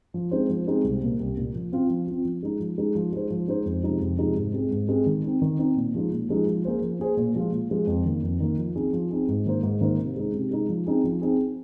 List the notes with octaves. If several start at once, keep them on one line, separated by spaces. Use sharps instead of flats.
F3
G#3 C4 D#4 C5
F3
G#3 C4 D#4 C5
C2
A#2 A#3
C2
A#2 A#3
F3
C4 F4
F3
C4 F4
F3
G#3 D#4
F3
G#3 D#4
F3
G#3 D#4 C5
F3
G#3 D#4 C5
F2
C3 F3 G#3 D#4
F2
C3 F3 G#3 D#4
G#2
G#3 C4
G#2
G#3 C4
D#3
C4 D#4
D#3
C4 D#4
A#2
F3 G#3 D#4
A#2
F3 G#3 D#4
F3
A#3 G#4 C5
F3
A#3 G#4 C5
A#2
F3 G#3 F4
A#2
F3 G#3 F4
F2
D#3 A#3
F2
D#3 A#3
F3
C4 D#4 G#4
F3
C4 D#4 G#4
G#2
D#3 A#3 D#4 C5
G#2
D#3 A#3 D#4 C5
C3
G#3 D#4
C3
G#3 D#4
F3
C4 D#4 G#4
F3
C4 D#4 G#4